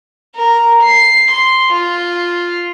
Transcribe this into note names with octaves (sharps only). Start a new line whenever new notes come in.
A#4
C7
C6
F4